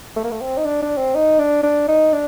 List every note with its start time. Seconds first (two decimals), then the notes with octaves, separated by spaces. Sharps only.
0.16 A3
0.24 A#3
0.31 A3
0.41 C4
0.57 D#4
0.65 D4
0.82 D4
0.97 C4
1.15 D#4
1.39 D4
1.63 D4
1.88 D#4
2.13 D4